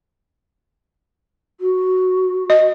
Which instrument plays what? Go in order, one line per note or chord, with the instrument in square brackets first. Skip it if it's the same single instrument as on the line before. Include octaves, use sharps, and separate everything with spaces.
[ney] F#4
[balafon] D#5